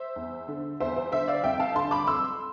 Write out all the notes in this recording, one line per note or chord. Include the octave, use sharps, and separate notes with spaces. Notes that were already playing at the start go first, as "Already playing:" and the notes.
Already playing: C5 E5
E2
D3
E2 C5 E5
C5
D3 C5 E5
D5 F5
F2 E5 G5
F5 A5
D3 A5 C6
B5 D6
F2 C6 E6